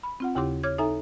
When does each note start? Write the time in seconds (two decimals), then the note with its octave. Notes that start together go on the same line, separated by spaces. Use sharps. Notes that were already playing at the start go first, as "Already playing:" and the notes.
0.03 B5
0.20 C4 F4 F#5
0.35 D#2 C#3 E4 G4 C6 D6
0.63 C#5 D6 F6 G#6
0.78 D#4 A4 E5 G#5 A#5